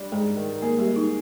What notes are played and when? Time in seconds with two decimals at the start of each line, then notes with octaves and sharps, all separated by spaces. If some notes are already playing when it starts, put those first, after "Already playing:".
Already playing: G3 D4
0.12 G#2 G#3 G#4
0.37 D#3
0.62 A#3 G#4 A#4
0.79 G3 G4
0.87 G#3
0.96 D#4